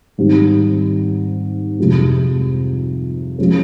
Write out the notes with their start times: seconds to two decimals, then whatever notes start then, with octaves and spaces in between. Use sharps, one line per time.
0.18 G#2 D#3 G3 C4
1.78 F2 C3 F3 G#3
3.38 F3 G#3 C#4